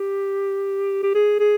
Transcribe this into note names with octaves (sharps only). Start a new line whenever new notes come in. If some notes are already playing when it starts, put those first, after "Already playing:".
Already playing: G4
G4
G#4
G#4